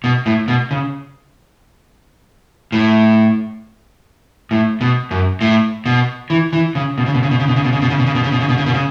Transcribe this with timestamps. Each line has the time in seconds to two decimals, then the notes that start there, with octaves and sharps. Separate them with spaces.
0.04 B2
0.26 A2
0.48 B2
0.71 C#3
2.72 A2
4.51 A2
4.81 B2
5.11 F#2
5.41 A2
5.86 B2
6.30 E3
6.53 E3
6.75 C#3
6.98 B2
7.06 C#3
7.14 B2
7.23 C#3
7.31 B2
7.40 C#3
7.48 B2
7.56 C#3
7.64 B2
7.73 C#3
7.82 B2
7.90 C#3
7.98 B2
8.06 C#3
8.15 B2
8.24 C#3
8.32 B2
8.41 C#3
8.49 B2
8.58 C#3
8.66 B2
8.74 C#3